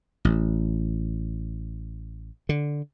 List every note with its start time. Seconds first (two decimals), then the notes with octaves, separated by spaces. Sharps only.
0.25 A1
2.49 D3